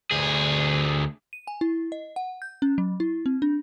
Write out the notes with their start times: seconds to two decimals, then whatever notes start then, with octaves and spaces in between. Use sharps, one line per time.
0.11 D2 G#4
1.33 D#7
1.47 G#5
1.61 E4
1.92 D#5
2.16 F#5
2.42 G6
2.62 C#4
2.78 F#3
3.00 E4
3.26 C4
3.42 D4